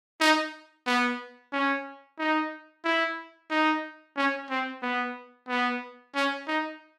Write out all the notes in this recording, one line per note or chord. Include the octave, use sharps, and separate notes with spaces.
D#4
B3
C#4
D#4
E4
D#4
C#4
C4
B3
B3
C#4
D#4